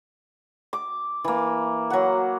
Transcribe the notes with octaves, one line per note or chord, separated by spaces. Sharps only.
D6
E3 A#3
F#3 F#5